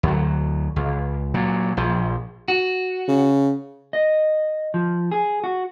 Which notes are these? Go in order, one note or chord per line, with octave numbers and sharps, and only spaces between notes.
D2 F#3
C#2
A#2 F#3
A#1 F3
F#4
C#3
D#5
F3
G#4
F#4